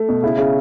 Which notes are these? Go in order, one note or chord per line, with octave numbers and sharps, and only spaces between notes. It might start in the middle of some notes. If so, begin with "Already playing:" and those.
Already playing: A3
B2
C#3 E4
C#3